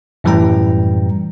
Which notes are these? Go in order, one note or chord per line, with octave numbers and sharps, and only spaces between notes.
F#2 A2 E3 G3 G5 A#5